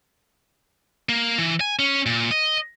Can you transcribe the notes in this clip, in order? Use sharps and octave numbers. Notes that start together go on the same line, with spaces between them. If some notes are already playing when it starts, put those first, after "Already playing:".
A#3
E3
G#5
C#4
A#2
D#5